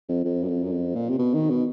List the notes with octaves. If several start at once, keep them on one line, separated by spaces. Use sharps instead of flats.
F2
F2
F#2
F2
F#2
F2
A#2
C3
B2
D#3
B2